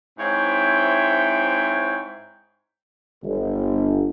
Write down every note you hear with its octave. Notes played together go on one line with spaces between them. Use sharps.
G#2 C4 E4 C#5 E5 G5
G1